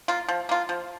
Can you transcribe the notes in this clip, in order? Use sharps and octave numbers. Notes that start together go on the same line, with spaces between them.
A#3 F4
F3
A#3 F4
F3